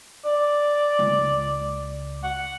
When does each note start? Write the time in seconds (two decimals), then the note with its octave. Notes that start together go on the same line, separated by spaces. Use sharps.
0.25 D5
0.99 C#2 G#3
2.23 F#5